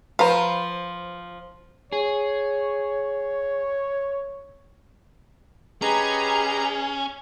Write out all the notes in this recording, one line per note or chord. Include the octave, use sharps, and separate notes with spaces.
F3 B4 C5 F5 A#5
G#4 C#5
C#4 G4 G#4 B4 D#5 A#5